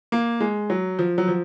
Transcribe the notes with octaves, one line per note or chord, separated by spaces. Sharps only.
A#3
G#3
F#3
F3
F#3
F3